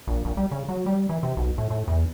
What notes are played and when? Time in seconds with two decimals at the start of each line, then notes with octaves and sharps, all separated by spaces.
0.07 A#1
0.25 A#1
0.37 G3
0.51 C#3
0.69 F#3
0.86 G3
1.09 E3
1.23 C3
1.37 B1
1.58 A2
1.70 A2
1.88 E2